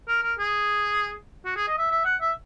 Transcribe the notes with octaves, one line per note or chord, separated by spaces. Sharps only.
A#4
A#4
G#4
F#4
G#4
D#5
E5
E5
F#5
E5